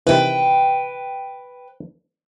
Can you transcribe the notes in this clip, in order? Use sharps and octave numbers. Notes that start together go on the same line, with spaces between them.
C3 D#3 E3 B4 G5